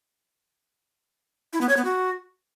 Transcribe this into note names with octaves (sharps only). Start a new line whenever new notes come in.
E4
B3
C#5
B3
F#4